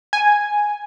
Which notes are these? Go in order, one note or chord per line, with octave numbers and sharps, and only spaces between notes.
G#5